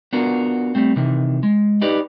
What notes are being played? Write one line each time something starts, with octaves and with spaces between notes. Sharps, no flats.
B3 D4 F4 F#4 A#4
G3 A3 C4
C3 D#3 E3
G#3
D#4 G4 B4 D5 D#5